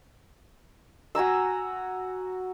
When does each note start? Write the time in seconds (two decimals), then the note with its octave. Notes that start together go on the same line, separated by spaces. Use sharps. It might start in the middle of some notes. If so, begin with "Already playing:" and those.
1.15 F#4 G#5 A#5 E6